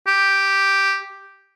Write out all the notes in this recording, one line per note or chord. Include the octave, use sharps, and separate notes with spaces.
G4